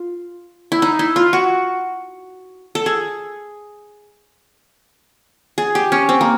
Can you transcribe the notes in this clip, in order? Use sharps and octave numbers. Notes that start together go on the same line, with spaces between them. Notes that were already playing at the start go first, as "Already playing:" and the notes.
Already playing: F4
E4
D#4
E4
F4
F#4
A4
G#4
G#4
G4
C#4
C4
A#3